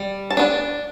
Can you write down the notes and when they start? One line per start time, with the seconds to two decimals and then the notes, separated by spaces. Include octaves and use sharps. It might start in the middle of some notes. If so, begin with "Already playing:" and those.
Already playing: G3
0.30 A5
0.37 B3 D4